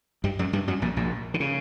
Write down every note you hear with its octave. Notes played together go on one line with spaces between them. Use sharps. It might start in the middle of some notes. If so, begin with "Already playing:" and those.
G2 G3
F#2 F#3
G2 G3
F#2 F#3
A#1 A#2
A#1 A#2
D3
C#3